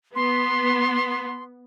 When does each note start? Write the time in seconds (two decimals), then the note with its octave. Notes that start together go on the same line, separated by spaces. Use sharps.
0.15 B3 C6